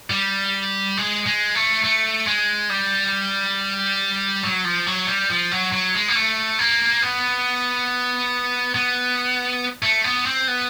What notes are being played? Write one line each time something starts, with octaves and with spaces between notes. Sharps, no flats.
G3
G#3
G#3
A3
A3
G#3
G3
F#3
F3
F#3
G3
F3
F#3
F#3
G#3
A#3
A3
A#3
B3
B3
A3
B3
C4
B3